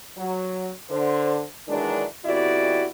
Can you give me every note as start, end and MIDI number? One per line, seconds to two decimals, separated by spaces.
0.18 0.70 54
0.90 1.42 50
0.90 1.42 72
1.68 2.04 51
1.68 2.04 52
1.68 2.04 54
1.68 2.04 56
1.68 2.04 62
2.25 2.87 41
2.25 2.87 47
2.25 2.87 64
2.25 2.87 66
2.25 2.87 67
2.25 2.87 74